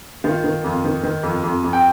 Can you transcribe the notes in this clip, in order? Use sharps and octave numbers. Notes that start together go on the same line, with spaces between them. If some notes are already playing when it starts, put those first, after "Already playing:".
D#3 F4 F5
D#3
F2
D#3
D#3
F2
F2
F2
G5